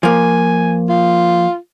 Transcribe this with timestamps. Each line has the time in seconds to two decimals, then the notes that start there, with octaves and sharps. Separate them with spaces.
0.03 F3 A#3 G#5
0.89 F4